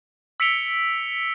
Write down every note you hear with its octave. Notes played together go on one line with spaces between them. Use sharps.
E6 B6 C#7 D7 F7 G7